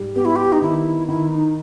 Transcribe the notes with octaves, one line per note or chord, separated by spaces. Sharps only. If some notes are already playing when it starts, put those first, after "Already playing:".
Already playing: G#2 G3
B3 G4
E4
G4
D#4
D#3 E4
D#3 E4
D#4